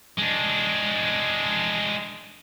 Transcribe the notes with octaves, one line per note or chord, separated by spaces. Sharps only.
G#3 D4